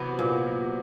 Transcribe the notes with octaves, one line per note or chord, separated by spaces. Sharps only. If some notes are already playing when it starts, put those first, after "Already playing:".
Already playing: C3 E3 F#3 B3
A#2